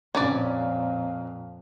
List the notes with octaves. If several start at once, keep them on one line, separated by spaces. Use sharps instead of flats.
F2 A#2 C#4 B4 D5